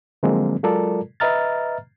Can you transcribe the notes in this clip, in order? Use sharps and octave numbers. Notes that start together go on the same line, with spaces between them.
D3 F3 F#3 G#3 A#3 C4
F#3 G#3 F4 A4 A#4 D5
B4 D#5 E5 A#5 F6 A6